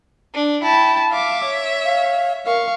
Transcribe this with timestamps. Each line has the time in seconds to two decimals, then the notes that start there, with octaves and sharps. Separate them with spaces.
0.34 D4
0.63 E4 G5 A5
1.11 E5 F5 D6
1.46 C#5
1.85 F5
2.46 A#4 F5 C#6